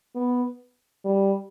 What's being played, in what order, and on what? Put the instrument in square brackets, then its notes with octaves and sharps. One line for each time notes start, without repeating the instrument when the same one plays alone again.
[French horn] B3
G3